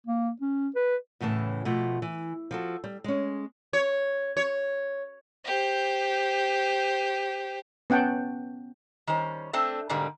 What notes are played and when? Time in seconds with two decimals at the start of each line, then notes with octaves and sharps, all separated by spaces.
0.07 A#3
0.42 C#4
0.76 B4
1.21 E2 A2 C#3 E3 A5
1.65 B2 F3 A3
2.02 E3
2.51 F3 F#4 A4
2.84 G3
3.04 G#3 C#4
3.73 C#5
4.37 C#5
5.45 G4 C5
7.90 B3 C#4 F#5 G5 A5
9.07 D#3 G3 C#4 C5
9.53 A3 C4 D4 C5 A5
9.89 G#2 B2 D3 G3 A#3